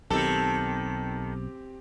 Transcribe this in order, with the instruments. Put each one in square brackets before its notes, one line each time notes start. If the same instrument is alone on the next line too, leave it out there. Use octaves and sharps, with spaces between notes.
[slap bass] B1 [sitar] D#3 A4 [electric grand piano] C4 G4